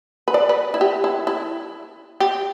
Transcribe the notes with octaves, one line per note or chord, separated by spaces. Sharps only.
B4
D5
B4
E4
G4
E4
E4
G4